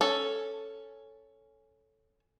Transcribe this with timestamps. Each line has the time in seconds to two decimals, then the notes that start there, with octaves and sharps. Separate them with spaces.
0.01 C#4 A4